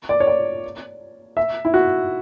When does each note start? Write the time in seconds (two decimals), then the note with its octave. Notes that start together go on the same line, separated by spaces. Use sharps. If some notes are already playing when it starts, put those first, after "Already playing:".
0.09 D5
0.20 C#5
0.27 D5
1.37 E5
1.65 E4
1.74 F#4